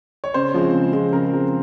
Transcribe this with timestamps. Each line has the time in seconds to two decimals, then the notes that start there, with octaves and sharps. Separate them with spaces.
0.24 C#5
0.34 C#3 C5
0.54 F3 G#3 C4
0.73 C#3
0.93 F3 G#3 C4
1.13 C#3 A#4
1.32 F3 G#3 C4